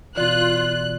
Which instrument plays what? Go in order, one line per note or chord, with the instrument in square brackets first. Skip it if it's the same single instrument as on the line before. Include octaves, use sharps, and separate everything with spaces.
[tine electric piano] B2 E3 [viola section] F4 [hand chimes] D5 [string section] F#6